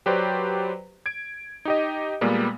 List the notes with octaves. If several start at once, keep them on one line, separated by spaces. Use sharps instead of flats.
F#3 G4 B4 C5 D5
G#6 D7
D#4 G4 D#5
A#2 G3 G#3 A#3 B3